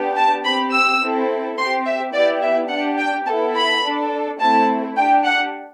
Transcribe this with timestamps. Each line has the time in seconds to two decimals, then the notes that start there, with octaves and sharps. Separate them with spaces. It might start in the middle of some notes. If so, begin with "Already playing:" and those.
Already playing: B3 D4 G4
0.16 A5
0.44 C4 G4 B5
0.72 E6
1.00 C4 E4 A4
1.57 C4 C6
1.62 G4
1.85 E5
2.13 B3 E4 G4 D5
2.42 E5
2.70 D4 G4 F#5
2.99 G5
3.26 B3 E4 A4 A5
3.56 B5
3.84 D4 A4
4.40 A3 C4 E4 A5
4.96 D4 G5
5.01 G4
5.25 F#5